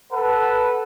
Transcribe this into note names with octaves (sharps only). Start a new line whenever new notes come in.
A4 B4 F#5